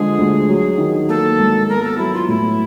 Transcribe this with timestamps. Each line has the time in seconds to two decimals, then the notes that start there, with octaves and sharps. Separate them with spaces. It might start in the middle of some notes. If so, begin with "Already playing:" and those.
Already playing: D3 F3 G#3 G#4
0.19 D2
0.49 F#3
0.78 D#3
1.08 A#3 A4
1.38 G#2
1.68 B3 A#4
1.84 A4
1.98 F#3 E4
2.14 F4
2.28 A2 E4